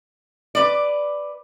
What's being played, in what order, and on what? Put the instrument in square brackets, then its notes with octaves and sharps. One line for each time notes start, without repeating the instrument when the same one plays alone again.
[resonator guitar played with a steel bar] B4 D5